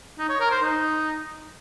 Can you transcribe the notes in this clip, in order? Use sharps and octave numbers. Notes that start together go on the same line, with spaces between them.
D#4
C#5
A#4
C5
D#4